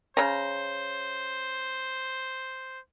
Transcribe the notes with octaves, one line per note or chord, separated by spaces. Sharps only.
C#3 C5 A#5